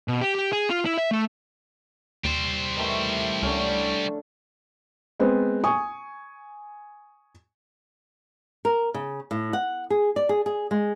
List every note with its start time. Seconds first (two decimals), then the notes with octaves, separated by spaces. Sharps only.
0.08 B2
0.21 G4
0.35 G4
0.52 G#4
0.70 F4
0.85 E4
0.97 E5
1.11 A3
2.24 D#2 G3 C5
2.76 D#3 E3 A3
3.42 C#2 D3 A3 C#4
5.20 G#3 B3 C4
5.64 G#5 C#6 D#6
8.65 A#4
8.94 C#3
9.31 A2
9.53 F#5
9.90 G#4
10.16 D5
10.29 G#4
10.46 G#4
10.71 G#3